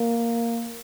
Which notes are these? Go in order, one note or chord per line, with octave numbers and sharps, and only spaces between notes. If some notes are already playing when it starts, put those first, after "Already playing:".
Already playing: A#3